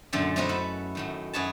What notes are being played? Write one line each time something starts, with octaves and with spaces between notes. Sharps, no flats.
F#2 A#2 D3 A3 G5
A3 C4 C#4 D#4 A#4 B4
E4 B4 F#5
F#2 A2 D#3
F#2 G#4 B4 C#5 A5